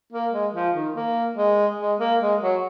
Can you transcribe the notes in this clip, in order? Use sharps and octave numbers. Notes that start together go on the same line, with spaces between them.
A#3
G#3
F3
D#3
A#3
G#3
G#3
A#3
G#3
F#3